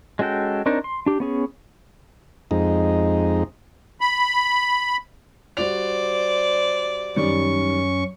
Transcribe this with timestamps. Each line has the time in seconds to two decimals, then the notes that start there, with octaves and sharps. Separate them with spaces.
0.19 G#3 C#4 F#4 A4 G5
0.66 C4 D4 D#4 A#4 C#5
0.84 C6
1.06 D4 G4
1.20 B3 C#4 G#4
2.51 F2 G#3 D#4
4.01 B5
5.57 G3 F#4 C5 D5 F7
7.16 F#2 D#3 G3 C#4 C#6